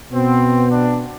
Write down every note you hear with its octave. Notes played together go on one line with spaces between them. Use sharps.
B2 B3 C4
D4